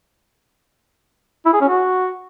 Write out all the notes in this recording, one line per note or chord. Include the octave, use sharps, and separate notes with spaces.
E4
G#4
C#4
F#4